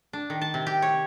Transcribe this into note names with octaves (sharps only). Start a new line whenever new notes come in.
D4
D#3
A5
C3
G4
C#5